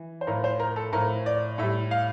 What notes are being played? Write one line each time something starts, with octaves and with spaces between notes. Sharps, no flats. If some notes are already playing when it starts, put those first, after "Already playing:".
Already playing: E3
C5
A2 F3 A#4
C5
A#4
A4
A2 F3 A#4
D5
A2 G3 E5
F5